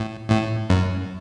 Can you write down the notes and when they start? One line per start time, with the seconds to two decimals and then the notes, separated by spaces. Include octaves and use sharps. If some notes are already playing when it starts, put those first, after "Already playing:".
Already playing: A2
0.30 A2
0.70 F#2